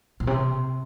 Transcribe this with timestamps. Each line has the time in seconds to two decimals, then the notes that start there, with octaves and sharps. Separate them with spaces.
0.20 A#2
0.27 C3